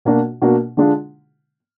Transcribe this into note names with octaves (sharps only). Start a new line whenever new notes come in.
B2 A#3 D4 F#4
B2 A#3 D4 F#4
D3 G#3 D4 F4